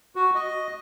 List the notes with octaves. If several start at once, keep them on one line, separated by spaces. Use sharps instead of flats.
F#4
D#5